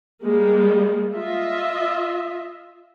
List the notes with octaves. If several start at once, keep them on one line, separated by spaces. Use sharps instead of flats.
G3 G#3 A#3
F4 D#5 E5